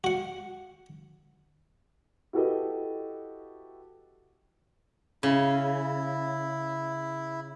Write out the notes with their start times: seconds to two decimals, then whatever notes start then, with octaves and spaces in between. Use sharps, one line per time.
0.04 F#4 F#5
2.33 E4 F#4 G4 A4 B4 D#5
5.23 C#3 E4